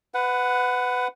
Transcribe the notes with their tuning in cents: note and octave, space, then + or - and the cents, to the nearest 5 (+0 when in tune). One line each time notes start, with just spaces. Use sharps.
B4 +20 F#5 +0